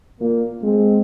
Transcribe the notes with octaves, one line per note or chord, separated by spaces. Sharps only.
A#2 A#3
G#3 C4